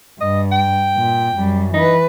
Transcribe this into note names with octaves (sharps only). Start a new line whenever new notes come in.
G2 D#5
G5
A#2
F#2 G3
E3 D#4 B4